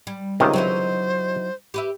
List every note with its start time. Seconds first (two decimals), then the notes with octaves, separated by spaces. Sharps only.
0.07 G3
0.40 C#2 C3 D#3 C#4 D4 D#5
0.53 F#3 D#4 E4 C5
1.74 G4 B4 E5